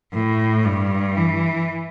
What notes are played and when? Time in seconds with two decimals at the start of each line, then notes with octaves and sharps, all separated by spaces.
0.14 A2
0.65 G2
1.16 E3